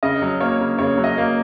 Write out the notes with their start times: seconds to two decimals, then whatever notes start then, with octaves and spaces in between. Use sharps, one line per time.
0.03 C#3 D#5
0.22 F#3
0.41 A#3 C#5
0.60 C#3
0.78 C#3 C#5
0.97 F#3
1.04 D#5
1.18 A#3